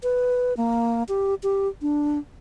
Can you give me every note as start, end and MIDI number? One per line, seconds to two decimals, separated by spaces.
0.03 0.56 71
0.57 1.03 58
1.09 1.35 67
1.43 1.68 67
1.82 2.18 62